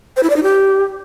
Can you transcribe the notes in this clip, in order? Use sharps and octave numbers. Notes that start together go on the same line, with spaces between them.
C5
E4
D5
D#4
G4